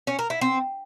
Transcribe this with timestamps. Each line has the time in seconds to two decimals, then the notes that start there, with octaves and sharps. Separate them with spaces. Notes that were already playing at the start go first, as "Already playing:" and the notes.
0.07 C#4
0.19 A#4
0.30 E4
0.41 C4